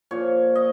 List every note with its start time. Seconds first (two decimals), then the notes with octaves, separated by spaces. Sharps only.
0.11 A#2 F3 C#5
0.55 D#5